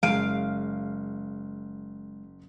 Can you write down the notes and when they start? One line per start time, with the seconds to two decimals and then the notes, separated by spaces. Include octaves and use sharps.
0.03 F#1 G#3 F5 D7 D#7